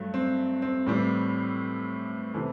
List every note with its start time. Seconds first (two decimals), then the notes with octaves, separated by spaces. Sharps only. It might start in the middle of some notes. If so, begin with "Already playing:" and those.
Already playing: G2 F#3 A3
0.14 C4
0.62 C4
0.86 A2 E3 G3 C4
2.34 C3 E3 A3